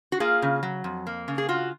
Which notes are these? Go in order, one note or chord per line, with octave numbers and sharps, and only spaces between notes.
F#4
A#3 F4 G#4
C#3
F#3
F2
A#3
C#3
G#4
F4 F#4